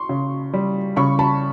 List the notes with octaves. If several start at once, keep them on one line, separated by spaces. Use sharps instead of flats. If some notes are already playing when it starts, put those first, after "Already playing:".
Already playing: C6 C#6
C#3
G3
C#3 B5 C#6
A5 B5